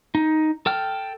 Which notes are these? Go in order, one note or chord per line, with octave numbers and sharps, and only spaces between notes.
D#4
A4 G5 F6